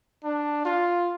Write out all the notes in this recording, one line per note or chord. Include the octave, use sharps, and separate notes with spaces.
D4
F4